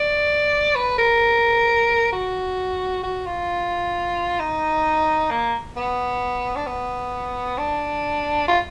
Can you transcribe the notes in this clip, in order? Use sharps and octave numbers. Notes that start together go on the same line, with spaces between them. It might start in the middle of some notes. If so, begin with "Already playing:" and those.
Already playing: D5
B4
A#4
F#4
F#4
F4
D#4
A#3
B3
D4
B3
D4
F4